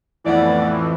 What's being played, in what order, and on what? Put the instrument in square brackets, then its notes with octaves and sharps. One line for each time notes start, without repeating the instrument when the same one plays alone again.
[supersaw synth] F2 A2 E3 [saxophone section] B3 D5